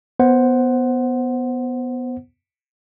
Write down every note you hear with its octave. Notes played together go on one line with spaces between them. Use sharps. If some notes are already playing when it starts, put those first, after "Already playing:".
B3 C5 F#5